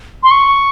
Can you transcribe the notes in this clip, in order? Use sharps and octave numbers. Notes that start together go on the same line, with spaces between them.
C6
C#6